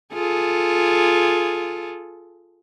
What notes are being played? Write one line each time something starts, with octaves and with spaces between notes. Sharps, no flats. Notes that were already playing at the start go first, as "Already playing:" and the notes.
F4 G#4 A4